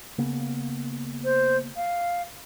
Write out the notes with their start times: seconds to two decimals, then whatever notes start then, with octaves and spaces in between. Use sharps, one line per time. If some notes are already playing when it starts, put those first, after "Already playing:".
0.18 C#3 A#3 B3
1.24 C5
1.76 F5